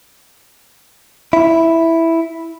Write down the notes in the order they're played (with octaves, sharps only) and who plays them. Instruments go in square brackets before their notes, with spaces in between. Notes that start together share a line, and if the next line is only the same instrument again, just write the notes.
[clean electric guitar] E4